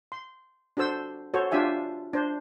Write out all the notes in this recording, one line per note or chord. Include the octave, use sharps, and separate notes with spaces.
C6
D4 F#4 A4 C5 E6
F#4 A4 C5 C#5
D4 F4 G4 E5 G#5
D4 C5